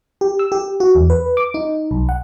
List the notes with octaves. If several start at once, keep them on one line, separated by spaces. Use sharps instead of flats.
G4
E6
G4
F#4
E2
B4
D6
D#4
B1
F#5